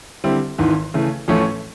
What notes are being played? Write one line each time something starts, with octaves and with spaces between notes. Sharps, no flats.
D3 G3 C4 E4
G#1 G#2 E3
C#3 E3 A3
A1 A2 F3 A3 C#4